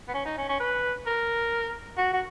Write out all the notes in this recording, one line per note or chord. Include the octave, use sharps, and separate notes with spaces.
B3
C#4
D#4
C#4
C#4
B4
A#4
F#4
F#4